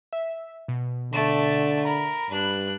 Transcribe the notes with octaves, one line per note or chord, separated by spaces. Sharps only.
E5
B2
D3 A3 D5
A#4 B5
G2 D4 F#6